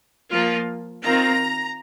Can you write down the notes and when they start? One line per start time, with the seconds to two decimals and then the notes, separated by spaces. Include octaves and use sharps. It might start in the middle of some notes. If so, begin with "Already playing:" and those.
0.31 F3 A#3 F4
1.02 D#3 C4 F4 A#5